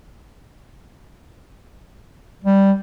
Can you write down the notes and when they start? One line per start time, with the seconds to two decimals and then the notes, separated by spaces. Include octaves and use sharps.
2.45 G3